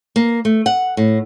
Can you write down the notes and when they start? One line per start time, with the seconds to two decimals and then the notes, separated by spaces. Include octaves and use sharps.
0.16 A#3
0.45 A3
0.66 F#5
0.97 A2